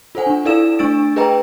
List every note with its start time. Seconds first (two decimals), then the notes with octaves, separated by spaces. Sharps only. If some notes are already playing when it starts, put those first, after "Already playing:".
0.15 F4 A4 C5 F#5 G#5
0.26 D4
0.45 E4 A4 D5 F5 E6 E7
0.79 A3 D4 E6 A6 D7
1.16 G#4 B4 D#5 G5 A#5